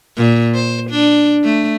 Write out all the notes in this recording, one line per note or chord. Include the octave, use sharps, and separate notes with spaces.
A#2
C5
D4
A3